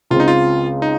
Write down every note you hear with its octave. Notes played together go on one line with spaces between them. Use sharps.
C#2 C#3 G#3 C4 F4
D#4
F4
D#4